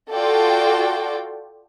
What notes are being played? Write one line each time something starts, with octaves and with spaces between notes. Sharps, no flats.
F4 F#4 A4 D5 G5